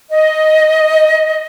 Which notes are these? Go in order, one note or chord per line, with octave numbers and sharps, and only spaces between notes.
D#5